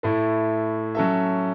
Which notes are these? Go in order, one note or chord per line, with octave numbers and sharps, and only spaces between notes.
A2 A3 E4
F#3 C#4 A4 E5